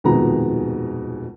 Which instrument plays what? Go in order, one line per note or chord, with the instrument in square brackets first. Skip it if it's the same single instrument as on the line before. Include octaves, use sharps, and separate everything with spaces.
[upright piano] D#1 F2 B2 D#3 G#3 A#5